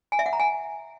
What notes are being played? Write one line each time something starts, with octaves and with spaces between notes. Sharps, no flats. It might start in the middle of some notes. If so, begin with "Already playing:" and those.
G#5
E5
F#5
A#5
G#5